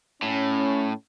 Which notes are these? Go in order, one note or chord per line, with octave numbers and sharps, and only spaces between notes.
A2 C#4